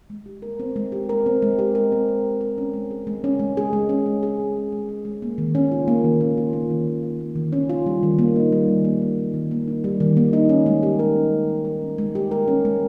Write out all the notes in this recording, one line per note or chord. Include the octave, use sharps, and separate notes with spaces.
G#3
G4
A#4
C4
G#3
G4
A#4
C4
G#3
G4
A#4
C4
G#3
G4
A#4
C#4
G#3
G#4
G#3
C#4
G#3
G#4
G#3
C#4
G#3
G#4
G#3
C#4
G#3
G#4
G#3
A#3
D#3
C#4
F4
A#3
D#3
C#4
F4
A#3
D#3
C#4
F4
A#3
D#3
C#4
F4
G3
D#3
A#3
D#4
G3
D#3
A#3
D#4
G3
D#3
A#3
D#4
G3
D#3
A#3
D#4
C#4
G#3
G4
A#4
C#4
G#3
G4
A#4
C#4
G#3
G4
A#4
C#4
G#3